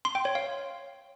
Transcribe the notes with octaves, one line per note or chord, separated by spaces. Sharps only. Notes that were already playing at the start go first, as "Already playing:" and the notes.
C6
G5
C#5
F5